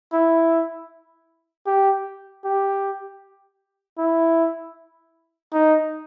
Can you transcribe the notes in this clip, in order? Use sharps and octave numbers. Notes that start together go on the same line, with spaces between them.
E4
G4
G4
E4
D#4